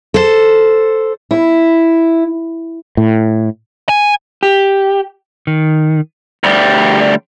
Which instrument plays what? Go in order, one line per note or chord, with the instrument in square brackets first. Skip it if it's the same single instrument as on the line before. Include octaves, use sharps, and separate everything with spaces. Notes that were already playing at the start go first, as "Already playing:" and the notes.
[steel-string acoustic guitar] A4 C5
E4
[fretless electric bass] A2
[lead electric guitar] G#5
[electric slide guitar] G4
D#3
[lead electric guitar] D2 G3